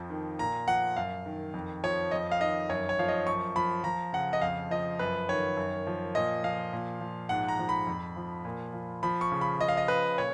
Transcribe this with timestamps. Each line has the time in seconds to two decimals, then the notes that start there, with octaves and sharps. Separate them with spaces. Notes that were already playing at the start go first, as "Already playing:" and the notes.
Already playing: F2 F3
0.10 D#3
0.39 A#2 A#5
0.67 F3 F#5
0.96 F#2 F5
1.26 D#3
1.54 F2
1.83 F3 C#5
2.11 F2 D#5
2.32 F5
2.40 D#3 D#5
2.70 F#2 C#5
2.89 C#5
2.99 F3 F5
3.08 D#5
3.27 F#2 C#6
3.56 F3 B5
3.84 F3 A#5
4.13 C#3 F#5
4.33 D#5
4.42 F2 F5
4.71 F3 D#5
4.99 F#2 B4
5.29 D#3 C#5
5.57 F#2
5.87 F3
6.15 A#2 D#5
6.43 F3 F5
6.73 A#2
7.01 F3
7.29 G#2 F#5
7.48 A#5
7.59 F3
7.69 B5
7.87 F2
8.16 F3
8.45 A#2
8.73 F3
9.03 F3 B5
9.21 C#6
9.32 C#3
9.41 B5
9.59 F3 D#5
9.68 F5
9.77 D#5
9.88 C#3 B4
10.18 A#2 C#5